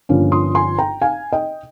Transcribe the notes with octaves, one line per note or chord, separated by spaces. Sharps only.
G1 G2 F3 A#3 C#4
C6 D#6
G#5 C6
G5 A#5
F5 G#5
D#5 G5